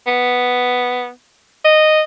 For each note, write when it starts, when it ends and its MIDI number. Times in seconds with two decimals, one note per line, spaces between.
0.07 1.09 59
1.64 2.01 75